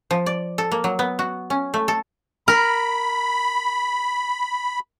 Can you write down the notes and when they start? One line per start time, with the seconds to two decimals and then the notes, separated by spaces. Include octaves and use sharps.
0.11 F3
0.26 D5
0.58 A4
0.72 A#3
0.84 F#3
0.99 B3
1.19 F#4
1.50 C#4
1.74 A3
1.88 A4
2.48 A#4 B5